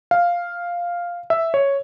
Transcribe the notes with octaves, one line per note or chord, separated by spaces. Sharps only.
F5
E5
C#5